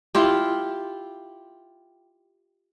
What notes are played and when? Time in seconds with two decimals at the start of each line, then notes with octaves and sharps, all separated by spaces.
0.15 E4 F4 G4